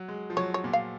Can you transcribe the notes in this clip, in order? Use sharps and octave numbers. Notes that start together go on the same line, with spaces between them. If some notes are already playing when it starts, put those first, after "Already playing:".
Already playing: F#3
G#3
F3
F#3 C#5
C#5
A#2
F5